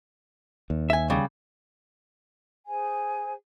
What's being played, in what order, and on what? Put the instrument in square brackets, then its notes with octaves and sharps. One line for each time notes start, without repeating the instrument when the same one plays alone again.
[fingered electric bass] D#2
[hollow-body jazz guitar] E5 G#5
C#3 G3
[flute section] G#4 C5 G#5